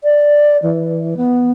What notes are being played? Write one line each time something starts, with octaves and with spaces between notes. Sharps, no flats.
D5
E3
B3